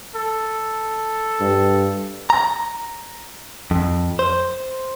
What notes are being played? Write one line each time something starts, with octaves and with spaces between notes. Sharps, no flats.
A4
G2
A#5
F2
C5